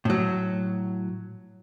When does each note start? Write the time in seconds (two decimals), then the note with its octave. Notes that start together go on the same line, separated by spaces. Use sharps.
0.05 A2 F#3